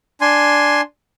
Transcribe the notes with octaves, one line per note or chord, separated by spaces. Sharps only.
D4 G#5 C6